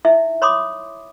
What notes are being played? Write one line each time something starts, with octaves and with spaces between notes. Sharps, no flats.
D#4 E4 E5
C#5 B5 C6 D6 D#6